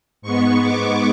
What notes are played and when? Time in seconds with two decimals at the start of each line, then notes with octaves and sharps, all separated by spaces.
0.22 G#2 G#3 B3 C#6
0.63 D6